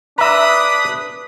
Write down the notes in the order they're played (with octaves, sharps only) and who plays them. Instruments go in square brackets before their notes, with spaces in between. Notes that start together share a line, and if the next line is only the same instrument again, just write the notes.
[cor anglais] D4 [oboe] B4 [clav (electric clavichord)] E5 A#5 [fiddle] B5 D#6